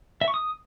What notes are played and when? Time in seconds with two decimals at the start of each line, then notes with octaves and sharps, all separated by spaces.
0.21 E5
0.28 C#6
0.34 D#6